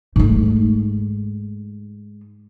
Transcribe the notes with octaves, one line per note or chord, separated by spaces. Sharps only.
G#2 A3